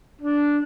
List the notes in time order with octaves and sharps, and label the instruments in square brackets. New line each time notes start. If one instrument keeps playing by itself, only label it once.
[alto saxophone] D4